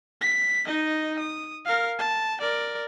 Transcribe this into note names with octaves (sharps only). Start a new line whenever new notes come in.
B6
D#4 D#5
D#6
A#4 F5
A5
A#4 D5